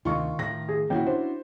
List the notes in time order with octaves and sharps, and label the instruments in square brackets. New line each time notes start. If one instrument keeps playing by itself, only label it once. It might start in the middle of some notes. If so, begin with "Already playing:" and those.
[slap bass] D2 C3 [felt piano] D#3 C#6 [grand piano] F4
[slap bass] A2 D#3 [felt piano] A#6
[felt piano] G#4
[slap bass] D#1 D#3 A#3 [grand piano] C#4 E4 F#4 [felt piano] G5
[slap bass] D4 [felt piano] C5